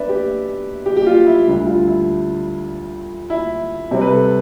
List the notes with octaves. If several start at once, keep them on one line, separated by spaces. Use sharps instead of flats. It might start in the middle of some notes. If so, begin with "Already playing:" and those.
Already playing: B3 D4 B4 D5 E5
G4
G4
G4
F4
E4
D2 D3 G3
F4
E4
E4
C3 G3 C4
B4
A4